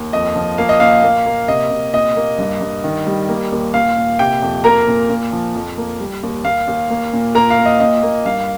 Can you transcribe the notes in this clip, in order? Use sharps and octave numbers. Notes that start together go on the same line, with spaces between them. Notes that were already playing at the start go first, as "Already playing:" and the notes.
Already playing: D#2
F2 D#5
F3
A#3 F5
D#5
A#2 F5
A#3
A#3
C3 D#5
C3
A#2 D#5
A#3
G2
G2
D#3
G3
A#3
D#2
A#2 F5
A#2
C3 G4 G5
F2
A#3 A#4 A#5
A#2
A#2
F3
F2
A#3
G3
D#2
D#2 F5
D#2
A#3
A#2
A#2 A#4 A#5
F5
A#3
D#5
A#2 D#5
A#3
G2 F5